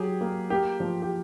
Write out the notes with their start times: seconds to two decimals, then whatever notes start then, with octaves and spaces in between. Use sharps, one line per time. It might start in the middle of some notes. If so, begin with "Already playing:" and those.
Already playing: F#3 G4 G#4
0.21 A#3
0.50 A#3 G4
0.80 F3
1.02 G4